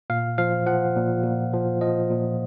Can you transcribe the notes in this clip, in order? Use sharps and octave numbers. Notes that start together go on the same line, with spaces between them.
A#2 F5
F3 F5
F3 F#5
A#2
A#2
F3
F3 D#5
A#2